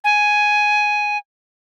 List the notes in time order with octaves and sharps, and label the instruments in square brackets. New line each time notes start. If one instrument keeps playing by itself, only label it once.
[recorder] G#5